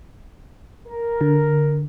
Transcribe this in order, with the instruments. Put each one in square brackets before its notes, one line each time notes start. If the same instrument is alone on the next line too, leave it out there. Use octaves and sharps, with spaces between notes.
[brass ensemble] A#4
[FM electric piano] D3